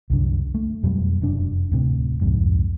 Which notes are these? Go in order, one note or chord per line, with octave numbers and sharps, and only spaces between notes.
C2 F#2 D3
A3
F2 B2 F#3 G3
F1 F#2 D4
D1 A2 C3
C2 F2 G#2